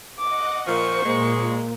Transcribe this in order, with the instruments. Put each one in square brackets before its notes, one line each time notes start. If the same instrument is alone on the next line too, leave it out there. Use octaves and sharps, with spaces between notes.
[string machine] D#5 F#5 [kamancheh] D6
[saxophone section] A#2 F3 [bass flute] A#4 [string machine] C5 [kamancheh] C#6
[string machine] A#2 [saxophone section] G#3 [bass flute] A#3